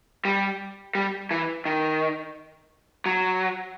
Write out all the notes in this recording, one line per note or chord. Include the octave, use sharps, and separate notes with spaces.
G3
G3
E3
D#3
F#3